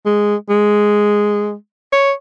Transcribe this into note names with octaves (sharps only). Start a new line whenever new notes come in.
G#3
G#3
C#5